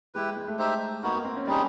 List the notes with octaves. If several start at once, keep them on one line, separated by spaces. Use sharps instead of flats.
G#3 E4 G4 B4
G#3
A3
D#4 G4 C5 E5
A#3 B3 D#4 F#4
A#3
C4
C#4
G3 C4 D4 D#4 G#4